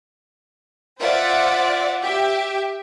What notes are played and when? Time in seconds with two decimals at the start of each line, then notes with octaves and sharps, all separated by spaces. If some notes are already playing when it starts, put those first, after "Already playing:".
0.99 F4 C5 D5 E5 F#5
2.03 G4 E5